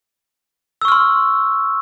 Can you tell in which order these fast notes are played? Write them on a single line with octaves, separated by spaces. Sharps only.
E6 C#6 F6 C6